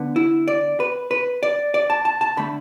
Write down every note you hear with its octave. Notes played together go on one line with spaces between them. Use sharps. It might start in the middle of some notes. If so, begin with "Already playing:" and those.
Already playing: D3 B3
E4
D5
B4
B4
D5
D5
A5
A5
A5
D3 A3 B5